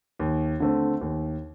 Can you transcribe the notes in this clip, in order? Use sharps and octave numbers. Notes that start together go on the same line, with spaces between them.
D#2
D3 A3 C4
D#2